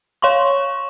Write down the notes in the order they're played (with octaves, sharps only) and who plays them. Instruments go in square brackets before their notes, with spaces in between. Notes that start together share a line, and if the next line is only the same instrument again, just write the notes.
[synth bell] C#5 F5 C6 C#6